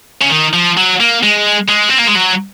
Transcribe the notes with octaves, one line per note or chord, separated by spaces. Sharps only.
C#3
D#3
F3
F#3
A#3
G#3
G#3
C4
A#3
G#3
F#3